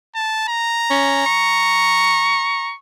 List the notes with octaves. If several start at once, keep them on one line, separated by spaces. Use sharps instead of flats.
A5
A#5
C#4
C#6